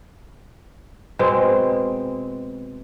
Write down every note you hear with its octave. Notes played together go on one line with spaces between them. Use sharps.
B2 G#3 C4